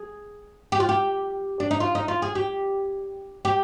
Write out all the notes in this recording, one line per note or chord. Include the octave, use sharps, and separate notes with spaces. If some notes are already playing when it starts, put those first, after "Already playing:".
Already playing: G#4
G4
F4
G4
D4
D#4
F4
D#4
F4
G#4
G4
G4